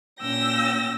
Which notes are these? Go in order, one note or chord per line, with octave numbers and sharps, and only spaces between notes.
A#2 C#4 G5 E6 A#6